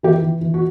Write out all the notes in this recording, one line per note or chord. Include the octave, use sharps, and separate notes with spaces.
E3 G4
E3
E3
F#4